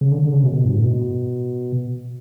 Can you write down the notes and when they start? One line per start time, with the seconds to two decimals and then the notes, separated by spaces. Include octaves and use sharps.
0.01 C#3
0.11 D3
0.22 D3
0.33 C#3
0.43 B2
0.53 B2
0.65 G2
0.75 A2
0.85 B2